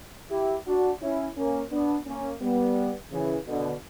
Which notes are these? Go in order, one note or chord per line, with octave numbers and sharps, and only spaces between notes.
E4 G4
D4 F#4
C#4 E4
A#3 C#4
B3 D4
A#3 C#4
G3 B3
C#3 E3
B2 D3